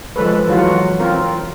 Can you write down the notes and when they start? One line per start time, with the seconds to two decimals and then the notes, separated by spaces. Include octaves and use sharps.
0.16 F3 G#3 A4 B4
0.48 E3 F#3 F4 F#4
0.99 C4 F4 A#4